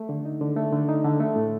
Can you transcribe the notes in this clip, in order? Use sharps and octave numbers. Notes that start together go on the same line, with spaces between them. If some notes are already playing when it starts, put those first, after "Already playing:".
Already playing: A3
D3
D#4
D3
A3
D3
D#4
D3
A3
A2